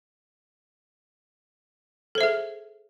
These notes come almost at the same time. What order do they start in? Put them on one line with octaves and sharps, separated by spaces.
A4 C5 E5 G#4